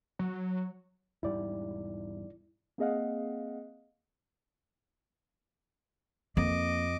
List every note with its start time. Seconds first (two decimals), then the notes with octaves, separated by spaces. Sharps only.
0.19 F#3
1.23 E1 G#2 G3 E4 D5
2.78 A#3 C4 G#4 D#5 F5 F#5
6.37 F2 A#3 D#5 D6